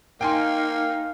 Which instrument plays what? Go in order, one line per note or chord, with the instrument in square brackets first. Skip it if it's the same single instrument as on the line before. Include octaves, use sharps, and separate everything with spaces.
[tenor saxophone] A#3 [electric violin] D#4 [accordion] F5 [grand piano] G5 G#5 C6